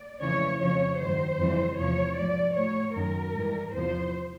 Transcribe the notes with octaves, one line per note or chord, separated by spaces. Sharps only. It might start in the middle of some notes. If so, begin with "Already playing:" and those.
Already playing: D5
F2 C#3 E3 C#5
F2 C#3 F3 C#5
G2 D#3 F#3 C5
F2 C#3 E3 G3
E2 C3 F3 C#5
G#2 F3 D5
A2 F#3 C#5
F#2 D#3 F#3 A#4
G#2 E3 G3
E2 C3 F3 C5